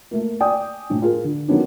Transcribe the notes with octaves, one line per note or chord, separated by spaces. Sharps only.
A3 A#3
D5 G5 G#5 D#6
A2 D4
F4 G#4 A#4
D3
D#3 F#3 B3 C#4 D4